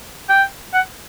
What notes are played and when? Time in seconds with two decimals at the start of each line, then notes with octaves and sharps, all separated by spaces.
0.29 G5
0.74 F#5